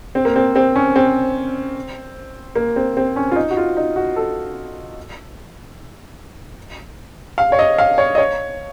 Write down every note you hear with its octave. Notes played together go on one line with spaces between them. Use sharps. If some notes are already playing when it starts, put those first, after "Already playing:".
C4
A#3
C4
C4
C#4
C4
A#3
C4
C4
C#4
F4
D#4
F#4
F4
D#4
F#4
A4
F5
C#5
D#5
F5
C#5
D#5
C#5